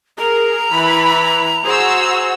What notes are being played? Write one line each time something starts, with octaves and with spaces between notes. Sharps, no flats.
G#4 A#4 A#5
E3 E4 B4 B5
F#4 G#4 C5 E6